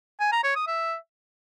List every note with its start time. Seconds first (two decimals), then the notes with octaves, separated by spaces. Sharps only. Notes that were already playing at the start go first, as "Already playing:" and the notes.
0.20 G#5
0.32 A#5
0.44 C#5
0.55 D#6
0.67 E5